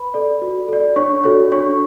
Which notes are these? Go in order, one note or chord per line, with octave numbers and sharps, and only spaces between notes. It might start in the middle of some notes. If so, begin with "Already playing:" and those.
Already playing: B4 B5
A4 D5
F#4
A4 D5
D4 C#5 C#6
F#4 A4 C#5
D4 C#5 C#6